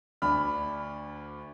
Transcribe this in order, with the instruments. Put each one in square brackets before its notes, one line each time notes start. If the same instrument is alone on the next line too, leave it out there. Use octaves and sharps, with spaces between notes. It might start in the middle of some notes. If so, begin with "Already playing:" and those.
[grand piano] D2 D4 B5 F6